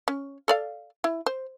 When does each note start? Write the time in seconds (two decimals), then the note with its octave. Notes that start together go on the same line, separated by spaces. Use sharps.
0.08 C#4
0.48 A4 D5 F5
1.04 E4
1.26 C5